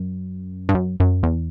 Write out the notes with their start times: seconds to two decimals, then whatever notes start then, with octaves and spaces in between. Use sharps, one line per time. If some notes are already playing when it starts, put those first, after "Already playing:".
Already playing: F#2
0.69 G2
0.75 F#2
1.00 F#2
1.23 E2